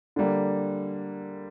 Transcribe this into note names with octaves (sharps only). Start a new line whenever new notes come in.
D3 G3 A#3